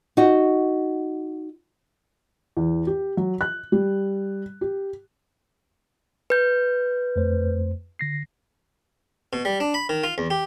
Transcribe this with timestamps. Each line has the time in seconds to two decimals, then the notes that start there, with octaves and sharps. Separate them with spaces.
0.17 D#4 F#4
2.57 E2
2.87 G4
3.17 F#3
3.41 F#6
3.72 G3
4.61 G4
6.30 B4 G6
7.16 F2 A3 C5
7.99 D3 A#6 C7
9.33 B2
9.45 G3
9.60 D4
9.74 B5
9.89 D#3
10.03 F4
10.18 E2
10.30 G4